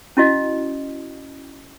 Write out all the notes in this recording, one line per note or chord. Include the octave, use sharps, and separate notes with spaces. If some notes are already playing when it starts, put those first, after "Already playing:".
C#4 E4 F#4 D#5